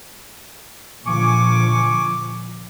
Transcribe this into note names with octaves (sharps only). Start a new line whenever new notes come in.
A#2 D3 F3 G#5 C#6 D6